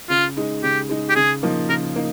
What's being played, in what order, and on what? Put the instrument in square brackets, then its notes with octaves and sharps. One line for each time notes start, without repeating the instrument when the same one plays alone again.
[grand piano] C#3 [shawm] F4
[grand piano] G#3 D#4
[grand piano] C#3 [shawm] G4
[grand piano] G#3 D#4
[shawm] G4
[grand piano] C#3 [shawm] G#4
[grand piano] F3 A#3 D#4
[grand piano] C#3 [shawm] A#4
[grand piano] A#3 D#4